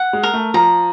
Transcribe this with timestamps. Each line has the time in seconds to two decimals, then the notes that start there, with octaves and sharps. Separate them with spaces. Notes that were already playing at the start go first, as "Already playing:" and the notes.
Already playing: F#5
0.13 G#3
0.23 A#4
0.33 A3
0.54 F3 A#5